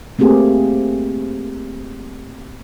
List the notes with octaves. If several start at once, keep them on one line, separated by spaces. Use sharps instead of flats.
A3 A#3 C4 G4 G#4